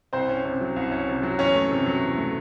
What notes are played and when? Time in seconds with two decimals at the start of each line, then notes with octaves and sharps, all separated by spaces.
0.13 C2 C4 C5
0.29 C#4
0.45 C3
0.61 F#3
0.76 C2
0.92 C#4
1.08 C3
1.23 F#3
1.39 E2 C#4 C#5
1.55 A3
1.72 C3
1.86 F#3
2.03 E2
2.18 A3